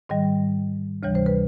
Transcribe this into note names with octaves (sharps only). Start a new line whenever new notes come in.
G#2 D#3 G3 D#5
D2 C3 E3 G3 C#5
C5
B4